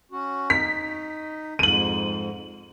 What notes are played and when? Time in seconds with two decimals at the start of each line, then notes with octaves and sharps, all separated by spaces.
0.12 C#4 F#4
0.50 D#4 B6
1.59 F2 G#2 D#7 F#7